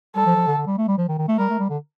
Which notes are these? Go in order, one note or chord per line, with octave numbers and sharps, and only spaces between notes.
G3 A4
F3
F3
D3
D3
G3
A3
G3
F3
D#3
D#3
A3
G3 A#4
A3
G3
D3